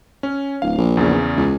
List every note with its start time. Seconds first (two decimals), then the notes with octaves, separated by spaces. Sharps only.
0.23 C#4
0.62 D1 F5
0.78 A#1
0.97 E2 C#3
1.37 C#2